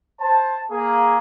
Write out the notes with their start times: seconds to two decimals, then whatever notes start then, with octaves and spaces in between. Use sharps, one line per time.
0.21 C5 A5
0.72 A#3 G#4